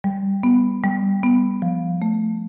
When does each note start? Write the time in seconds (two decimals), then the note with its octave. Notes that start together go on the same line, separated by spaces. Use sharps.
0.04 G3
0.43 B3
0.83 G3
1.23 B3
1.62 F3
2.02 A3